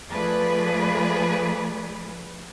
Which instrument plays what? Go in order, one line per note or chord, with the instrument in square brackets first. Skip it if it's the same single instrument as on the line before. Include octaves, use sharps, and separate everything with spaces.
[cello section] F3 A3 G#4 B4 D5